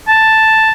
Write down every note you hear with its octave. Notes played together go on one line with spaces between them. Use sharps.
A5